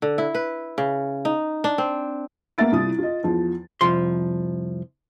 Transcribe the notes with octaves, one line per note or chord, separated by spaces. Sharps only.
D3
E4
B4
C#3
D#4
D4
C4
A#3 B3 E5 A6 D7
C2 E4 F4 D#6
F4 D#5
E2 F3
C2 F2 F3 C6